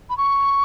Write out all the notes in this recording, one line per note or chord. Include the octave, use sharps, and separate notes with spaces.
B5
C#6